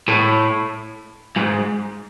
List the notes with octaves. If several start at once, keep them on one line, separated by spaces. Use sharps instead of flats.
A2
G#2